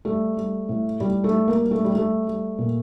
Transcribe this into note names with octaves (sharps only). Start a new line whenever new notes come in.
G3 A3
G3
A2
A2 G3
A3
G3
A#3
G3
A3
G3
G3 A3
G3
A#2